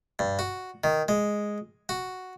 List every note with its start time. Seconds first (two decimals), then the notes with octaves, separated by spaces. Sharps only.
0.19 G2
0.39 F#4
0.84 D#3
1.08 G#3
1.89 F#4